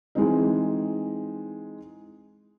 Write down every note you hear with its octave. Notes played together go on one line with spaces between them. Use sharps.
E3 G#3 C4 D#4